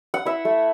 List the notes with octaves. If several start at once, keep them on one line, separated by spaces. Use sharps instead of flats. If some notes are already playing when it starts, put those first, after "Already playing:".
F#5
E4 E5
A3